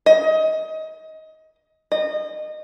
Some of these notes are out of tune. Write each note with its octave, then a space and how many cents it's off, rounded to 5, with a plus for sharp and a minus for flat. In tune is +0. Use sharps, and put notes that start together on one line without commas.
D#5 +20
D#5 -20